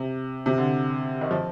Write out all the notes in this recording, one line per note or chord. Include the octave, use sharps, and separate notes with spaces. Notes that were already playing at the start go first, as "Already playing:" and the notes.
Already playing: C3
C3
D3
D#3
F3